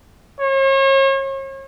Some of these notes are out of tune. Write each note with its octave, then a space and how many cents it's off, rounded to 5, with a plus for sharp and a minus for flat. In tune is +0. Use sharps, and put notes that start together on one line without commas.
C#5 -40